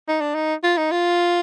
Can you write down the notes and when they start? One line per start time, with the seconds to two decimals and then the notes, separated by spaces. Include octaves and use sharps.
0.08 D#4
0.21 D4
0.35 D#4
0.64 F4
0.78 D#4
0.91 F4